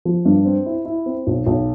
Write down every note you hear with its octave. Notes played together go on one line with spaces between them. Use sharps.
F3
G2
C4
E4
E4
C4
B1
B1